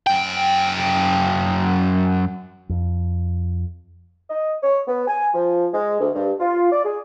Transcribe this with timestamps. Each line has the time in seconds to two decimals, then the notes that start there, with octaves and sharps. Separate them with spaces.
0.07 F#2 G5
2.69 F2
4.30 D#5
4.63 C#5
4.87 B3
5.07 G#5
5.34 F3
5.73 G#3
6.00 D2
6.14 G2
6.39 F4
6.72 D5
6.84 G#4